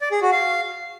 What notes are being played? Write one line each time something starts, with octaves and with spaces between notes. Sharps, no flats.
D5
G#4
F#4
F5